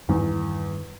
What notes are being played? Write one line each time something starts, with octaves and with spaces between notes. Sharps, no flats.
E2 G2 D#3 G3